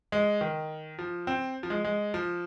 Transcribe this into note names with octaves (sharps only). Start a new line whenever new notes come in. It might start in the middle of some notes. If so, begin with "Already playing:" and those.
G#3
D#3
F3
C4
F3
G#3
G#3
F3